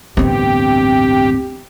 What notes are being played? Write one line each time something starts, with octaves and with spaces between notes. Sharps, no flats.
A1 D2 G2 B3 C4 G4